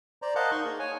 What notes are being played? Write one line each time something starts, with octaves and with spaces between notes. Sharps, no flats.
C5 D5 A#5
A#4 C5 D#5 F5 F#5 A5
D#4 C6 C#6
A#3 G#4
C#5 G#5